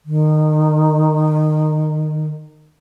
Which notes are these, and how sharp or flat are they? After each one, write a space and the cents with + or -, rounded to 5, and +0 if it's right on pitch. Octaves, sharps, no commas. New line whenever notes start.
D#3 -20